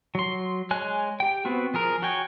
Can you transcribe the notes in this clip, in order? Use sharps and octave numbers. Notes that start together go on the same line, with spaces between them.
F#3 C6
G#3 C#5 G#5 F#6
G4 G5
B3 C4 F#4
F3 G#4 A#4
F#4 C#5 G5 G#5